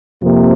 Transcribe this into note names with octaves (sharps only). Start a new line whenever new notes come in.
F2 C3 F3 A#3